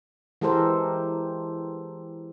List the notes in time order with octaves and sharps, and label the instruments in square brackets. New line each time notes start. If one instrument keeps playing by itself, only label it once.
[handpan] E3 G#3 G4 A4 A#4 C5